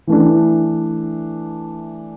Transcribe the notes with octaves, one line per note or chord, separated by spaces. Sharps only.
E3 A3 D4